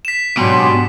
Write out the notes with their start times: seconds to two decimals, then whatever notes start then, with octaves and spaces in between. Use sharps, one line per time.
0.05 B6 E7
0.37 G#2 B2 F#3 D4 G4 G#5 C6